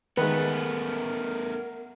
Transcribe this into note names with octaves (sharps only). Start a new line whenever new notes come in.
D#3 G#3 A3 B3 A#4 B4